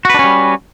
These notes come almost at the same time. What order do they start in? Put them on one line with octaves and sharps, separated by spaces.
F#4 B4 D4 C#4 G3